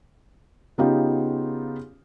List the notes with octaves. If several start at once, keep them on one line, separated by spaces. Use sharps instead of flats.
C#3 B3 D#4 F4 G4